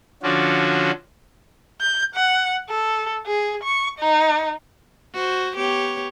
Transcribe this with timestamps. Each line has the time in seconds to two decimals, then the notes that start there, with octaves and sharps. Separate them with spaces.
0.23 D3 F3 C#4 D4 F#4
1.81 G6
2.15 F#5
2.70 A4
3.27 G#4
3.64 C#6
4.00 D#4
5.14 F#4 C5
5.55 B3 G4 C#5